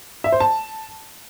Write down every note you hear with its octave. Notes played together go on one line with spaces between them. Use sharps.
E5
C5
A5